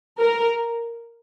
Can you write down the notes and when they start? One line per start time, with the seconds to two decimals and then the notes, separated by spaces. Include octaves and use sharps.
0.20 A#4